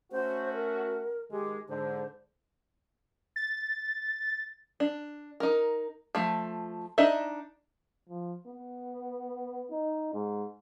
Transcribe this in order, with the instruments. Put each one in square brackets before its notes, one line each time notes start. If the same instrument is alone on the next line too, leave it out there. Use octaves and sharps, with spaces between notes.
[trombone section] A3 C#4 F#4 [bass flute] C5
[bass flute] A#4
[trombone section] D#3 G#3 [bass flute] G4
[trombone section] G#2 D3 [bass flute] C5
[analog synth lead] A6
[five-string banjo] D4
D#4 A#4
F3 A3
D4 D#4 D#5 E5
[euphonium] F3
B3
D#4
G#2